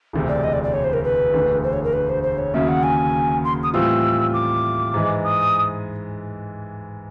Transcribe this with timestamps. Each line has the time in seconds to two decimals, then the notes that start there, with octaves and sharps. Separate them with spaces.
0.13 E1 D2 C3
0.28 D5
0.44 D#5
0.53 D5
0.63 D5
0.73 C#5
0.84 C5
0.93 A#4
1.04 B4
1.33 E1 D2 D3
1.63 C5
1.73 C#5
1.84 A#4
1.93 B4
2.09 C5
2.23 C5
2.38 C#5
2.54 D#2 C#3 F#3 E5
2.68 F#5
2.83 G#5
3.44 C6
3.63 D#6
3.74 A2 E3 G3 C4 F4 E6
4.33 D6
4.94 G#2 E3 G#3
5.24 D#6